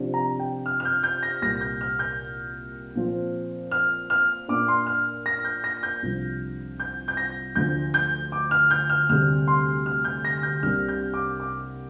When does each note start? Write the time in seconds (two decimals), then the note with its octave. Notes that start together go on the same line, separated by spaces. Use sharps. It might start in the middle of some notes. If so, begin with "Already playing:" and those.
Already playing: C3 F3 D4
0.14 A#5
0.39 G5
0.66 F6
0.80 F6
0.85 G6
1.03 G6
1.23 A#6
1.42 C2 A#2 G3 A#3 A#6
1.61 G6
1.81 F6
1.99 G6
2.95 A#2 F3 C4
3.71 F6
4.10 F6
4.48 A#2 A#3 D4 D6
4.68 C6
4.87 F6
5.26 A#6
5.44 G6
5.64 A#6
5.83 G6
6.02 C2 C3 F3 D4
6.80 G6
7.08 G6
7.17 A#6
7.55 D2 D3 F3 D4 G6
7.94 G6
8.32 D6
8.51 F6
8.71 G6
8.89 F6
9.09 D2 C3 G3 F6
9.48 C6
9.86 F6
10.04 G6
10.25 A#6
10.43 G6
10.63 C2 C3 G3 A#3 D4 F6
10.88 G6
11.14 D6
11.40 D6